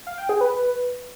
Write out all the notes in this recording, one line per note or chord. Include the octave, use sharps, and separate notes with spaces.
F5
G5
G#4
B4